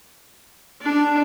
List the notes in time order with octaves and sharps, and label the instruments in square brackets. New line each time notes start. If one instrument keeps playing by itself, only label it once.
[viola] D4